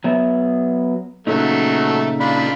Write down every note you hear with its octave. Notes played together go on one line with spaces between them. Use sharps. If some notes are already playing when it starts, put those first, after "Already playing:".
F#3 B3 E5
A#2 C#3 F#3 A3 D#4
D4 F4 B5